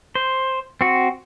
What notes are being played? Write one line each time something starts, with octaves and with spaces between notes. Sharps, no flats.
C5
C4 F#4